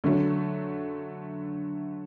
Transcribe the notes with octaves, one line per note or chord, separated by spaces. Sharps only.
D3 F#3 A3